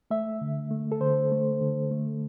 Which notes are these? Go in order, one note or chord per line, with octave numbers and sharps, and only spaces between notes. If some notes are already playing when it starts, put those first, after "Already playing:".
A3 E5
D3
A3
A4
D3 C5
A3
D3
A3